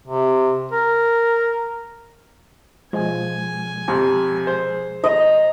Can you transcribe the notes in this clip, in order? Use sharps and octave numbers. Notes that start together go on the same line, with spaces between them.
C3
A#4
B2 F3 G#3 G#5
F2 C3
G#4 C5
D#5 A#5